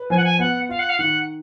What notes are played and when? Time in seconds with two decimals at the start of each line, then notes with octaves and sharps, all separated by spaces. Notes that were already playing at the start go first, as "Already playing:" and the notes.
Already playing: B4
0.10 F3 G#5
0.17 F#5
0.24 G#5
0.38 B3 F#5
0.69 F4 F5
0.79 F#5
0.89 F5
0.98 D#3 F#5